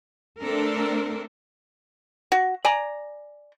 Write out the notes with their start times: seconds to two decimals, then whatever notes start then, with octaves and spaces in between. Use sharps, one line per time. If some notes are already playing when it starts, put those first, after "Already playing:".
0.41 A3 C4 D4 A4 A#4
2.32 F#4
2.65 D5 G#5 A#5